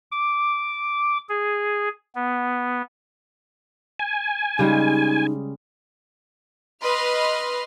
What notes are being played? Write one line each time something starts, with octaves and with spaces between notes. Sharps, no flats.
D6
G#4
B3
G#5
C#3 G3 G#3 D#4
B4 D#5 C6 F6